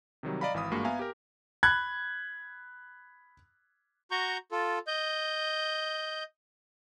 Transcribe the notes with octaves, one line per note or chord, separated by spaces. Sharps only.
C3 D#3 F#3 G3
D5 D#5 F5 A#5 B5
G#1 E3 F5 B5 D#6
G2 G#3 A#3 F#4
B3 E5 F5 G#5 A#5
G4 A#4
B5 F#6 G#6
F#4 A#5 C#6 G6
F4 A4
D#5 G6